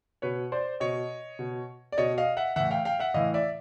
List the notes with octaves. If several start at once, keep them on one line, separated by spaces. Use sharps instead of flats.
B2 B4 C#5
C5 D5
B2 C#5 D#5
B2
D5
B2 C#5 D#5
D#5 F5
E5 F#5
A2 E3 E5 F#5
F5 G5
F5 G5
E5 F#5
A2 E3 D#5 F5
D5 E5